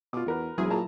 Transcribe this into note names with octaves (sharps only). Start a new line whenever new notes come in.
B2 F4 D6
E2 F#4 A#4 B4
E1 F#3 E4 G#4
A#2 A5 A#5